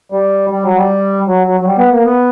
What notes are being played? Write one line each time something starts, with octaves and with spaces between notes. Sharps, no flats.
G3
G3
F#3
G3
F#3
F#3
F#3
G3
B3
A#3
B3